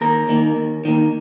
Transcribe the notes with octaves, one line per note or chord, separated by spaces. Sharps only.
D#2 A#4
D#3 A#3
D#2
D#3 A#3